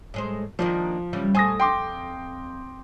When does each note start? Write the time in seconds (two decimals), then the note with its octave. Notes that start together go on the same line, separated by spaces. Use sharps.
0.14 A2 G#3 C5
0.59 D#3 F3 A#3 D4
1.13 C#3 E3 G3
1.35 A#2 A3 C5 G#5 D#6 A#6
1.60 F2 G5 C6 D6